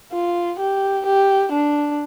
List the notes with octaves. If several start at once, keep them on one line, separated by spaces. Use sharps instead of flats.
F4
G4
G4
D4